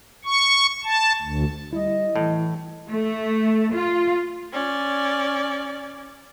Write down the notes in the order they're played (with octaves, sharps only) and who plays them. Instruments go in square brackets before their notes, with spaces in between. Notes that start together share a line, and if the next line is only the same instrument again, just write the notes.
[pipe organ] C#6
A5
D2
[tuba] G3 [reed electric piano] E4 [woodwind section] D#5
[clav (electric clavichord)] A2 [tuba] E3
[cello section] A3
F4
[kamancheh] C#4 D5